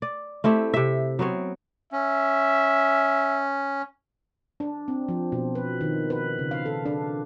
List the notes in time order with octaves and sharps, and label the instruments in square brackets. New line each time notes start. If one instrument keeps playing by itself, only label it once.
[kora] D5
A3 C4 E4 G4
C3 E5
F#3 B3 C4 C#5
[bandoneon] C#4 [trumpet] E5
[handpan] D4
C4
F3
B2
B4
D#3
B4
C#3
F5
A4
D4